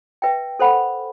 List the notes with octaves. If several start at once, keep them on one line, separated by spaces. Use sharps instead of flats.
B4 E5 G5
A4 C5 F#5 B5